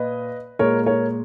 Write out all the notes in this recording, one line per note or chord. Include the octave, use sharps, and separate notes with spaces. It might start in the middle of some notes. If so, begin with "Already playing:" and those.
Already playing: A#2 B4 D#5
A#2 G#3 A#4 C#5
A#4 C#5